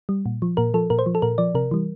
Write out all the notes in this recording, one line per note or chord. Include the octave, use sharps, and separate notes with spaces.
G3
A#2
F3
A#2 A#4
F3 A4
A#2 A#4
C5
F3
A4
A#2 A#4
F3 D5
C3 A#4
E3 G3